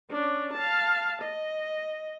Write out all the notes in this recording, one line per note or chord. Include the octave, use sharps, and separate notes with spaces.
C#4 D4
F5 A5
D#5